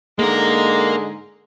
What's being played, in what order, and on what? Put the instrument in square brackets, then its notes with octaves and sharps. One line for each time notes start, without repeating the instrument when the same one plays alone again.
[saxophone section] G#2 D3 G#3 [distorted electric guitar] A#3 A#4